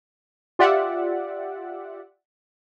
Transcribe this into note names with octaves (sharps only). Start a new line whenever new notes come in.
F4 G4 D5 E5 F#5